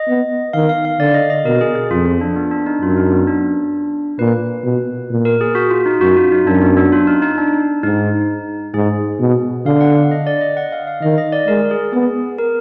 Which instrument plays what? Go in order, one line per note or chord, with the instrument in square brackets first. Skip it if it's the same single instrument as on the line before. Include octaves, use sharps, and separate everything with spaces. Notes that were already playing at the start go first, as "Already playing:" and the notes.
Already playing: [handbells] D#5
[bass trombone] B3
[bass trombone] D#3 [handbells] F5
[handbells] F5
F5
[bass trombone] D3 [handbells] D5
[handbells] D#5
D#5
[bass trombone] B2 [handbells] A#4
[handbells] G#4
G#4
[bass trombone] F2 [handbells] F4
[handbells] F4
D4
B3
D4
D#4
[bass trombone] F#2 [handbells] F4
[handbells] D4
D#4
B3
D4
[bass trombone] A#2 [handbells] B4
[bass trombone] B2
A#2
[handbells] A#4
G#4
F#4
F4
D#4
[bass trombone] F#2 [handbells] F#4
[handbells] F4
D#4
[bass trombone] F#2 [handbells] D4
[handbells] B3
D4
F4
D#4
D#4
D4
[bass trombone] G#2 [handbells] D#4
[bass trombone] G#2 [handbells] G#4
[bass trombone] B2
[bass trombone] D3 [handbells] F5
[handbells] F#5
F5
D#5
D5
D#5
F#5
F5
F5
[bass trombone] D#3 [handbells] D#5
[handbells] D#5
D5
[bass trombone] G#3 [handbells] A#4
[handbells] G#4
[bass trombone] B3 [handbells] G#4
[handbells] A#4